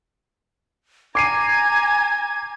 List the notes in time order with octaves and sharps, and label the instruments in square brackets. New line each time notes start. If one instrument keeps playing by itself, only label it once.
[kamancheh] G#5 A#5 [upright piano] D6 C7 D#7 [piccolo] G#6